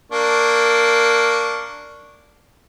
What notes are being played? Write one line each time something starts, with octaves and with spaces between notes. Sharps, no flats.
A#3 D4 C#6